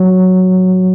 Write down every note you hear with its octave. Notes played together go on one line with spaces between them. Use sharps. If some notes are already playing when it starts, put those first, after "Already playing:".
Already playing: F#3